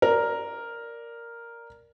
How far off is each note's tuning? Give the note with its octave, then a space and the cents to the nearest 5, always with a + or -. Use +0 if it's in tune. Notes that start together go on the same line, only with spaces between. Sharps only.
A#4 +0 D5 +0